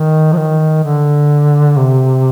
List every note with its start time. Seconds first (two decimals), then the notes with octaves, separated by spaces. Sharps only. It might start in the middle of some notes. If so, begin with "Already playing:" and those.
Already playing: D#3
0.33 F3
0.37 D#3
0.83 D3
1.77 C3